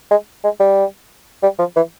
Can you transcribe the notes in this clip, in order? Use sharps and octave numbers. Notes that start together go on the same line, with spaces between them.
G#3
G#3
G3
G3
F3
E3